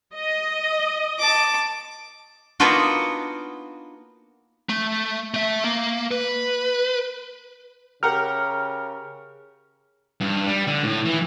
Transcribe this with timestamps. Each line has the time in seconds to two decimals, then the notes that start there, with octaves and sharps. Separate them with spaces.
0.14 D#5
1.19 A5 D6
2.60 A#3 B3 D4 D#4 F4 F#4
4.69 A3
5.34 A3 E5
5.64 A#3
6.11 B4
8.03 C#3 G4 A#4 F#5 F6
10.21 G2
10.46 G3
10.67 D3
10.83 A2
11.05 E3